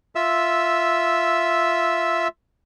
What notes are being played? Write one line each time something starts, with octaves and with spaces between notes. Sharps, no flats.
F4 E5 E6